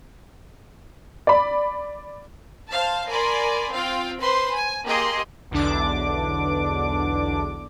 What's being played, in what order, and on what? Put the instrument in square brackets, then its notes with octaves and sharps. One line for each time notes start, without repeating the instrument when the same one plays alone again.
[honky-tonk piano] D5 B5
[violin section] C5 F5 A5
A#4 D5 G#5 B5 C6
C4 F4 F5 G5
B4 C5 C6
G#5
A#3 G4 G#4 D#5 C6
[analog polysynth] B1 E2 D3 D4 D6